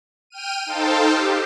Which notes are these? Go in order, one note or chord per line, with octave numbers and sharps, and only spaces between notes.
G5 F6 D#7
D#4 A4 C5 F5 G5 A5
G4